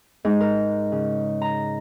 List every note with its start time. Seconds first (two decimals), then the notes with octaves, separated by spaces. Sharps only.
0.25 G#2
0.41 A#4
0.92 C#3
1.42 A#5